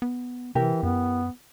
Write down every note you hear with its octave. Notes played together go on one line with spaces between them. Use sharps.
B3
C3 E3 E4 G4 A#4
F#2 B3